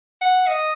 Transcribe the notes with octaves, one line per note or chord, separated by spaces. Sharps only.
F#5
D#5